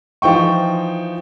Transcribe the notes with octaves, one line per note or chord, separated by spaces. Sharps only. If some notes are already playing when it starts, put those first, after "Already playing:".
E3 F3 D#4 G5 C#6